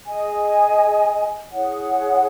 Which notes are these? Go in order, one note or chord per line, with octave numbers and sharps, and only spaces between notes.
G#4 D#5 G#5
E4 G#4 C#5 F#5